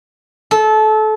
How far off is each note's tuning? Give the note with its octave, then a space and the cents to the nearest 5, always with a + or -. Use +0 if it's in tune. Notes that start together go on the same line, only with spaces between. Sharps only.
A4 -25